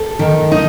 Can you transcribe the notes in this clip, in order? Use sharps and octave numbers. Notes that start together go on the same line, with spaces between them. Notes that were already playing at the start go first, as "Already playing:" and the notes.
Already playing: A4
D#3
D#4